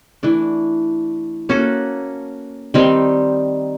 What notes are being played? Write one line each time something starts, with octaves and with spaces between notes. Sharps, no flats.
E3 A3 D4
A#3 C#4 F#4 A4
D#3 G3 C4 D#4